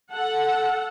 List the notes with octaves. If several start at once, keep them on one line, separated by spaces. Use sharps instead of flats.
A4 F#5